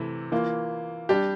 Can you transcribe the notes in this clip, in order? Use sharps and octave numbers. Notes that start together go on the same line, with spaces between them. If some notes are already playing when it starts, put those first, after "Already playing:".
Already playing: C3 E3 A3 E4
E3 A#3 F4
G3 D4 G4